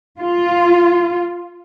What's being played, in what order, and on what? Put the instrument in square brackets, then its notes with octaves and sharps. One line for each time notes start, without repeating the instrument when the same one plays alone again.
[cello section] F4